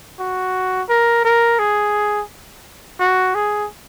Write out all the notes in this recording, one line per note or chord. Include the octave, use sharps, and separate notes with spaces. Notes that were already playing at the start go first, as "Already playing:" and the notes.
F#4
A#4
A#4
G#4
F#4
G#4